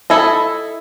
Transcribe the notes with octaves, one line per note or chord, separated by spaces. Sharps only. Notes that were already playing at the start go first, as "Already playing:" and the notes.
E4 A4 D#5